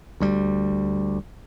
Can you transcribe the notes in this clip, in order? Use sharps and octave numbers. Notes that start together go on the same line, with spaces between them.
D2 G3